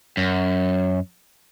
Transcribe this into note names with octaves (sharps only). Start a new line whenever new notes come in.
F#2